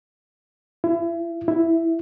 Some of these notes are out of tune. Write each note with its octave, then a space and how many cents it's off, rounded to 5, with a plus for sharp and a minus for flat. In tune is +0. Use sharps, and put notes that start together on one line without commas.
E4 +35
E4 +5